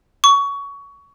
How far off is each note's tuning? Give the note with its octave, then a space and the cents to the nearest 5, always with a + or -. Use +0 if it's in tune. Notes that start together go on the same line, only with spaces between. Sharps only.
C#6 +20